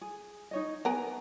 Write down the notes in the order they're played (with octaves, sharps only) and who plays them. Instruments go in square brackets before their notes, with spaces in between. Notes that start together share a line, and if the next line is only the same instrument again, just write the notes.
[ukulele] G#4
D#4 C#5 D#5
[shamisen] B3 A#4 [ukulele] G#5